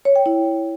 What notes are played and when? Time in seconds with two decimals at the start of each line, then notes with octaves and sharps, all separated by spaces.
0.05 C#5
0.16 G5
0.26 E4